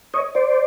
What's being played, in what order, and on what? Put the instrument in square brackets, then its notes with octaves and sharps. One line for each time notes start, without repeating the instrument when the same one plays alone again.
[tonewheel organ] C#5 D#5
C5 D5